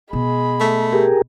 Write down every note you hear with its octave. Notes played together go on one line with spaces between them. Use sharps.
B2 G#3 B5
A3
G4 G#4 A#4